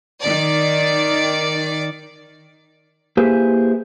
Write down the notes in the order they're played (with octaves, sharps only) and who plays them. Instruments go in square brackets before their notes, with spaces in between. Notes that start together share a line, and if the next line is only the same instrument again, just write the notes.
[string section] D#3 D5
[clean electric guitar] A#3 E4 G4 G#4 B4 C5